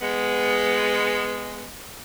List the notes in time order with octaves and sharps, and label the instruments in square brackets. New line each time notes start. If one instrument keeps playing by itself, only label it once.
[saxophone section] G#3 B3